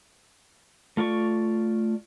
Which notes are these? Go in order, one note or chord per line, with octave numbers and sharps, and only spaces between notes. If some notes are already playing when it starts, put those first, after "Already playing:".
A3 F4 D5 C#6